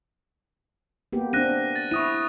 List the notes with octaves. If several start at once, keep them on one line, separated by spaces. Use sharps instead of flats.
A#3 B3 G4
C4 D4 F#6 A#6 D#7
A6
E4 C#6 D#6 D#7